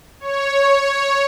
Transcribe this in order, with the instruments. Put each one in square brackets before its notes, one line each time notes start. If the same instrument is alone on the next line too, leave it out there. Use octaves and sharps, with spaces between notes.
[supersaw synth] C#5